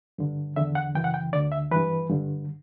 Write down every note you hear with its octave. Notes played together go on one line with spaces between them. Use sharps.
G2 D3
E2 D3 E5
F#5
F#2 C#3 E3 G5
F#5
G5
D2 D3 D5
E5
G2 E3 B4
G2 D3